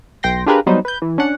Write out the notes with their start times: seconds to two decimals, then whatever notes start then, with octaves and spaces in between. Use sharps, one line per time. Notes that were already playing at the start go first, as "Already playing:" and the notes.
0.23 B1 G5 C6 A#6
0.46 D4 F4 G4 G#4 A#4 B4
0.66 F#3 G3 B3 D#4 B4 C5
0.85 B4 G6
1.02 E3
1.18 C#4 D4 F#5